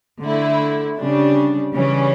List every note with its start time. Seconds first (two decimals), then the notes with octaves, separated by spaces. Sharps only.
0.23 D3 A3 E4
0.98 C#3 G3 D4
1.75 C#3 E3 G3 C#4